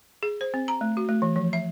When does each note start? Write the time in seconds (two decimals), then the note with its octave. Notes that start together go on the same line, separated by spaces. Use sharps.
0.23 G#4
0.41 C5
0.54 C4
0.68 A#5
0.81 A3
0.97 F#4
1.09 A3
1.22 E3
1.36 F3
1.53 E5